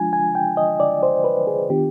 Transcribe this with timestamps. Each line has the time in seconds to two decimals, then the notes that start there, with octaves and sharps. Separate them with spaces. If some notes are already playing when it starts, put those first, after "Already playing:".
Already playing: F3 G#3 D4 F4 G#5
0.13 G#5
0.35 G5
0.57 D#5
0.80 D5
1.03 C5
1.24 B4
1.47 G#4
1.70 D#3 B3 D4 F4 G4